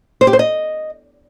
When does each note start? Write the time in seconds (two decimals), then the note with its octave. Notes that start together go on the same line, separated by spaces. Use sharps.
0.21 C5
0.27 G4
0.33 C5
0.39 D#5